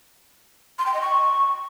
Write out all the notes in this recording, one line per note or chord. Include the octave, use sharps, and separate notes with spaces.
C6
G5
D#5
C#6